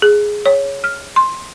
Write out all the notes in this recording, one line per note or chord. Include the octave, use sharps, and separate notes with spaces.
G#4
C#5
F6
C6